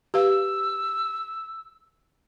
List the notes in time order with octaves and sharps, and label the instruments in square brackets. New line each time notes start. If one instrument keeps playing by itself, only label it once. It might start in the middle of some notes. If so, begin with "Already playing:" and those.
[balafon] G4 B4 F5 [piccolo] E6